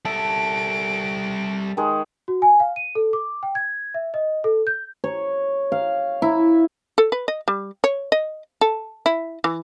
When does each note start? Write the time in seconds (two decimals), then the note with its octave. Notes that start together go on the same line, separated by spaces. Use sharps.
0.05 G3 A4 E5 D7
1.77 D#3 G#3
2.28 F#4
2.42 G#5
2.60 F5
2.76 D#7
2.95 A4
3.13 D6
3.43 G5
3.55 G#6
3.94 E5
4.14 D#5
4.44 A4
4.67 G6
5.04 C#5
5.72 F5
6.22 E4
6.98 A4
7.12 B4
7.28 D#5
7.48 G3
7.84 C#5
8.12 D#5
8.61 A4
9.06 E4
9.44 E3